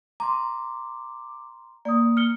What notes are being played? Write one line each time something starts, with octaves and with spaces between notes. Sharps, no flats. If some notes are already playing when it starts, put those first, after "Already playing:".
A#5 C6 D6
A#3 D5 D#6
F6 C#7 G7